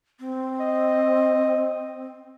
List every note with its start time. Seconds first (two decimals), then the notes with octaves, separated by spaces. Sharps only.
0.20 C4
0.60 D#5